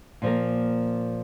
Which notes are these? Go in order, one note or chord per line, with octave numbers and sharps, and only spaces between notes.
A#2 F3 A#3